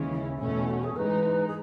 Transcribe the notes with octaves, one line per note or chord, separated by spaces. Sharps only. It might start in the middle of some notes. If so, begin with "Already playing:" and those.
Already playing: D#2 C#3 E3 G#3 C#4
E4
E2 B2 A3 C#4
F#4
G#4
G#2 E3 G#3 D#4 B4
G#4